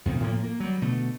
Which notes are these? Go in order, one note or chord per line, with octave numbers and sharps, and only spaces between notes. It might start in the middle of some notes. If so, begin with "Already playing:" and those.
F2 B2 D#3 C4
A2 F3 G3 A#3
A#3
F#3 G3
B2 D3 A3